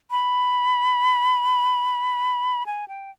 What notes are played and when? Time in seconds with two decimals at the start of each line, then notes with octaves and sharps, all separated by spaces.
0.11 B5
2.66 G#5
2.88 G5